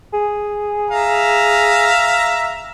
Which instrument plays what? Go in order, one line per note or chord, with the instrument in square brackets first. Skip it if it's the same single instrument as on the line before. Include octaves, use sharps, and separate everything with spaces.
[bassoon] G#4
[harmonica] E5 F5 A#5